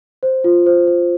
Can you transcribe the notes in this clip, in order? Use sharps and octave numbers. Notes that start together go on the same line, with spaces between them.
C5
F4
C5
C5